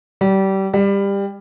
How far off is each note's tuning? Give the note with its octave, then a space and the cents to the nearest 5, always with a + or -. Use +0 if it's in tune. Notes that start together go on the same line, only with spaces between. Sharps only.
G3 -25
G3 +20